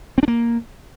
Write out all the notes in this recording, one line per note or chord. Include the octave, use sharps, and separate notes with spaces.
C4
D4
A#3